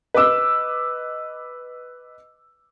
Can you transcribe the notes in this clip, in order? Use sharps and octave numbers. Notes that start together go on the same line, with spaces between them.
B4 D#5 D6 E6